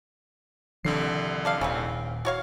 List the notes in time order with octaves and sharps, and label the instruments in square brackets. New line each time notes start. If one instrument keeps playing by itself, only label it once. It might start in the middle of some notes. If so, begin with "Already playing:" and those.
[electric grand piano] C2 D3 C7 [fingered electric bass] D#3 F3 D4
[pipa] A4 D5 F5
[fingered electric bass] D#1 [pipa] C#3 E3 C4
[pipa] F#4 C#5 F5